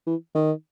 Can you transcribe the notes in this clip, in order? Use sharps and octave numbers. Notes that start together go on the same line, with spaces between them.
E3
D#3